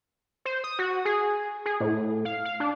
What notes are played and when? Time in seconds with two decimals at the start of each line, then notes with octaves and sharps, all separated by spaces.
0.45 C5
0.64 D#6
0.79 F#4
1.05 G#4
1.66 G#4
1.80 A2
2.25 F5
2.45 F5
2.60 D4